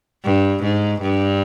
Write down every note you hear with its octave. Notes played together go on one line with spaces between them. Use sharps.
G2
G#2
G2